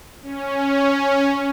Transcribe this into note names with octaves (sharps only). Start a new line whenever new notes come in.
C#4